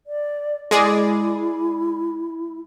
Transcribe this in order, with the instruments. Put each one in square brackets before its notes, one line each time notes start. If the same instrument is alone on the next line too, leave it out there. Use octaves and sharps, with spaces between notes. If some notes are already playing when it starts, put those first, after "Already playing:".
[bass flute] D5
[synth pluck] G#3 G#4 D5 [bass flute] E4